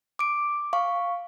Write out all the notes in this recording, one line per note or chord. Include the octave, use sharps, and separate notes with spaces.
D6 D7
F5 C#6